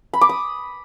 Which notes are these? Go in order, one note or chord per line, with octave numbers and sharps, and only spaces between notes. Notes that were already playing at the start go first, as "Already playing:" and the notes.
B5
D6
D#6